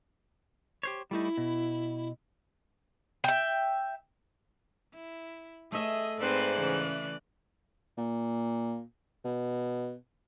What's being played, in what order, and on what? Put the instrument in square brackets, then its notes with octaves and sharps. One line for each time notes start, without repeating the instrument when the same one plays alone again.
[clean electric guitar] G4 C5 C#5
[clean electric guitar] G3 A3 D#4 [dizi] E4
[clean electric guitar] B2
[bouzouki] E5 G5
[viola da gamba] E4
[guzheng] A3 E5 [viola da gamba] G#4 [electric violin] D#5
[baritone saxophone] G#2 [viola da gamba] C4 B4 C5 [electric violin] D5 F#6
[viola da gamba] C#3 E3
[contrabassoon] A#2
B2